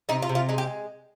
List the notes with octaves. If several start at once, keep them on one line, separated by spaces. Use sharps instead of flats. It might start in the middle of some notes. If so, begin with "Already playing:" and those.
C3 D#4
F4
C3
F4
G#3 D#4
G4